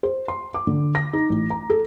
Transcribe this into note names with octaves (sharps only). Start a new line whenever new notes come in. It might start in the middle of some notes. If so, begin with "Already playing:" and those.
C5
C6
D6
D3
A#6
D#4
A1
A#5
A4